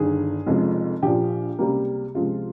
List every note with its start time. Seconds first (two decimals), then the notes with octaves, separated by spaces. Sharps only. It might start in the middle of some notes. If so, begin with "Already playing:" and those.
Already playing: G1 G2 D#3 G#4
0.47 F1 F2 C#3 F3 G#3
1.02 A#1 A#2 F3 G4
1.59 C#2 C3 G3 A#3
2.15 C#2 C3 F3 G#3 F4